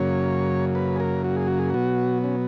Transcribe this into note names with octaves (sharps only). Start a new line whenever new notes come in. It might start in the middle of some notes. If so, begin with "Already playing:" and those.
Already playing: F#2 C#3 F#3 A#3 C#5
B4
G#4
A#4
F#4
G#4
F#4
G#4
B2 F#3 B3 F#4
C#4